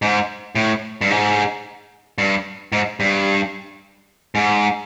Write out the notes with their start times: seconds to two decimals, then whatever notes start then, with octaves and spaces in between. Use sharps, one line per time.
0.02 G#2
0.55 A2
1.01 G2
1.10 G#2
2.18 G2
2.72 G#2
3.00 G2
4.35 G#2